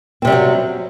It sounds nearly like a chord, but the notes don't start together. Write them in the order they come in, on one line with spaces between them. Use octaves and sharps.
C4 C3 G3 E3 F#3